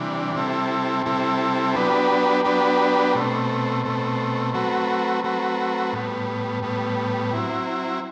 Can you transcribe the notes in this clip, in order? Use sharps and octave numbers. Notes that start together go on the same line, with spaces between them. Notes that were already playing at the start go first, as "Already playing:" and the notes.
Already playing: C3 E3 G3 D4
C3 G3 C4 E4 A4
C3 G3 C4 E4 A4
F#3 B3 D4 G4 B4
F#3 B3 D4 G4 B4
B2 A3 C4
B2 A3 C4
F#3 A3 C4 F#4 B4
F#3 A3 C4 F#4 B4
A2 G3 B3
A2 G3 B3
F#3 C4 E4